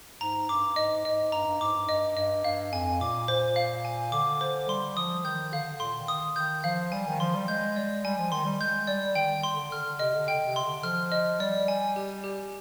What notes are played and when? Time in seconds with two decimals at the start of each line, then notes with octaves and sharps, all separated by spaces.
0.21 G#2 A#5
0.49 G2 D6
0.76 G#2 D#5
1.05 G#2 D#5
1.32 G2 A#5
1.47 G2
1.61 G#2 D6
1.75 G2
1.89 G2 D#5
2.17 G2 D#5
2.44 G2 F5
2.73 F2 G#5
3.01 A#2 D6
3.28 A#2 C5
3.56 F5
3.85 G#5
4.12 D3 D6
4.41 C5
4.68 G3 C6
4.97 F3 D#6
5.25 D#3 G6
5.53 D3 F5
5.80 A#2 C6
6.00 D#3
6.08 D#6
6.36 D#3 G6
6.64 F3 F5
6.92 G3 G#5
7.07 D#3
7.20 F3 C6
7.34 G3
7.48 G#3 G6
7.76 D5
8.04 G3 G#5
8.18 F3
8.32 D#3 C6
8.46 G3
8.60 G#3 G6
8.87 G3 D5
9.15 D#3 G5
9.43 C6
9.54 D3
9.72 D3 F6
9.85 D3
9.99 C3 D#5
10.14 D3
10.28 G5
10.46 C3
10.56 C6
10.65 D3
10.83 F3 F6
11.12 D#5
11.40 G3 D5
11.68 G#5
11.96 G4
12.24 G4